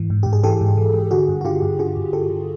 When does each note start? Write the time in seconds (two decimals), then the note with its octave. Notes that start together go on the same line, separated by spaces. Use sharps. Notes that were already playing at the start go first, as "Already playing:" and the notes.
Already playing: G#2 E3
0.10 G#2
0.23 G#2 G4
0.33 G#4
0.43 E3 G4 A4
0.61 G#2
0.77 E3
0.94 G#2
1.11 D3 F#4 G#4
1.29 G2
1.41 F#4
1.45 D3 F4 G4
1.62 G2
1.79 D3 F#4 G#4
1.96 G2
2.13 D3 G4 A4
2.30 D3